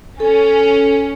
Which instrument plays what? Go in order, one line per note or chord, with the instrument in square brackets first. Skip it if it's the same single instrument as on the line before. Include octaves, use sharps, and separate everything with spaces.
[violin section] C#4 [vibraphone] A4